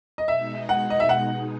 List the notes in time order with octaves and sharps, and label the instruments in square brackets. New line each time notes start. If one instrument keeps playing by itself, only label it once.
[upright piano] D#5
[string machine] B2 G#3 D#4 [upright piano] E5
[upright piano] F#5
D#5
E5
F#5